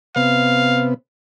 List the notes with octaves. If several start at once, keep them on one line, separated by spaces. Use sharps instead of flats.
C3 B3 F5